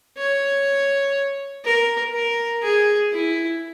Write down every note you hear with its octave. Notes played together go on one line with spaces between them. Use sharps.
C#5
A#4
A#4
G#4
E4